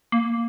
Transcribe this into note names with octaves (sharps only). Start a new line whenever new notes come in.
A#3